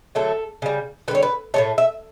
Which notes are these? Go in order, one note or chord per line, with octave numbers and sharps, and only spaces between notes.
D3 F#3 A3 A4
C#3 G3
D3 G3 B4 C#5
B4
A2 F#3 A3 C#5
E5